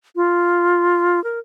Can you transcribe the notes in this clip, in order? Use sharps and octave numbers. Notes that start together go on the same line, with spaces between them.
F4
A#4